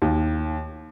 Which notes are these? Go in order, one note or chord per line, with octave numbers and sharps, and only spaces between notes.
D#2